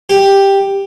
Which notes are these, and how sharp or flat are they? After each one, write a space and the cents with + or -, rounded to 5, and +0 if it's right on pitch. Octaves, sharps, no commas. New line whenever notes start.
G4 +5